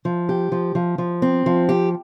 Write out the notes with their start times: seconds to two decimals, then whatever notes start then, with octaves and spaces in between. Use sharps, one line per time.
0.05 F3
0.29 G4
0.52 F3
0.75 F3
0.98 F3
1.22 C4
1.46 F3
1.69 G4